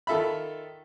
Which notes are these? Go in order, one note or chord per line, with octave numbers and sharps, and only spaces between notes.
D#3 F4 A4 E5 B5